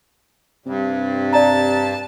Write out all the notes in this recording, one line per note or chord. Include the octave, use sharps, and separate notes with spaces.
G2 C3
D5 A5 A#5